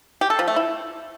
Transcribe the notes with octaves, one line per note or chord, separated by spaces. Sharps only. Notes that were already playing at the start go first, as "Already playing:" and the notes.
G4
A4
F3
A3
E4